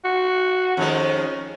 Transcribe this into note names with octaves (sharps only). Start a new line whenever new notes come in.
F#4
F2 D#3 G#3 C#4